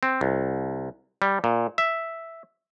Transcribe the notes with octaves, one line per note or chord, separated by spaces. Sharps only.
C4
C2
G3
A#2
E5